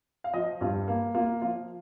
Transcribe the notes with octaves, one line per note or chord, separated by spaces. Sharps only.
F5
F3 D#5
G2 F4
A#3
A#3 F4
F3 F4